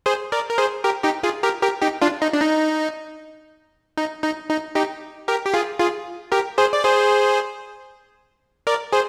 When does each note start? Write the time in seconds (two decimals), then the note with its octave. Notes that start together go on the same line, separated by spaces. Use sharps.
0.06 G#4 C5
0.32 A#4 D5
0.50 A#4
0.58 G#4 C5
0.84 G4 A#4
1.04 D#4 G4
1.23 F4 G#4
1.43 G4 A#4
1.63 G4 A#4
1.82 D#4 G4
2.02 D4 F4
2.22 D#4
2.33 D4
2.41 D#4
3.97 D#4
4.23 D#4
4.50 D#4
4.75 D#4 G4
5.28 G4 A#4
5.45 G4
5.54 F4 G#4
5.79 F4 G#4
6.32 G4 A#4
6.58 G#4 C5
6.73 D5
6.84 G#4 C5
8.67 A#4 D5
8.92 G#4 C5